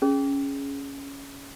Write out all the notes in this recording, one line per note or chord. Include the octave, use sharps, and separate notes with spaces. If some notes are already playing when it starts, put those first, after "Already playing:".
C#4 G#4